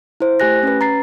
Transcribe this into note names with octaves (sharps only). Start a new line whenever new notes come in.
E4 C5
A3 G4 G#5 F#6 A#6
C#4 B4
A#5 A6 C7